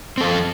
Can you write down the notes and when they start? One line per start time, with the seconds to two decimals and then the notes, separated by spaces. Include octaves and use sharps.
0.18 C4
0.21 A4
0.24 F3